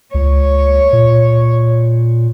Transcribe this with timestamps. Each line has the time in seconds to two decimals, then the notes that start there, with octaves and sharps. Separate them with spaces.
0.14 C#2 C#5
0.93 A#2